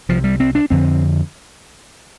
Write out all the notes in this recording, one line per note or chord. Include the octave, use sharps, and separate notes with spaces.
C2 C3 F3
G3
C4
D4
F2 D3 C4